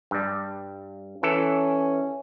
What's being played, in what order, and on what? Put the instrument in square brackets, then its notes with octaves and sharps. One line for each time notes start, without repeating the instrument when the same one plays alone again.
[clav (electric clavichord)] G2 G3
[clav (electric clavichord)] E3 A4 [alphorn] C#4